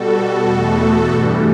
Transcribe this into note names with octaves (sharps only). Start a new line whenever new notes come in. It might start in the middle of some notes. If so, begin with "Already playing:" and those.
Already playing: B2 G3 F#4 A4
E2 B2 A3
G2 E3 G3